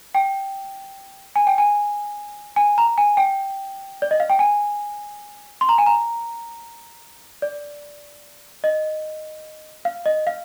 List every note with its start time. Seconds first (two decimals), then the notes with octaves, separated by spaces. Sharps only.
0.15 G5
1.36 G#5
1.47 G5
1.58 G#5
2.56 G#5
2.78 A#5
2.98 G#5
3.17 G5
4.02 D5
4.11 D#5
4.20 F5
4.30 G5
4.39 G#5
5.61 C6
5.69 A#5
5.78 G#5
5.86 A#5
7.42 D5
8.64 D#5
9.85 F5
10.06 D#5
10.27 F5